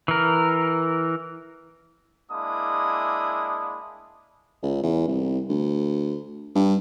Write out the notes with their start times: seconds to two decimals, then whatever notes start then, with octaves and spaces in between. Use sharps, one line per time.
0.08 E3 A#4
2.32 G#3 A#3 D4 E4 D#6
4.63 C#2
4.83 E2
5.08 C2
5.49 D2
6.56 G2